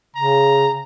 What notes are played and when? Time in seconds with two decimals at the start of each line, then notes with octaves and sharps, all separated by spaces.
0.16 C#3 A#5